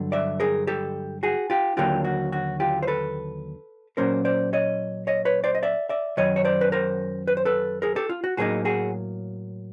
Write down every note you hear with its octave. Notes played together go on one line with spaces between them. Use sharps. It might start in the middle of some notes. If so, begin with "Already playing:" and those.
Already playing: G2 D3 F#3
D5 E5
G#4 A#4
G4 A4
F#4 G#4
F4 G4
D#2 D3 F#3 A#3 F4 G4
F#4
F#4
F4 G4
C5
A4 B4
A#2 F#3 A#3 C#4 A#4 C5
C5 D5
C#5 D#5
C#5 D#5
B4 C#5
C5 D5
D#5
D5 E5
D5 E5
F#2 D#3 F#3 C#5 D#5
C#5
C5 D5
B4
A#4 C5
B4
C5
A4 B4
G#4 A#4
G4 A4
F4
F#4
A2 F#3 A#3 D#4 F#4 G#4
F#4 G#4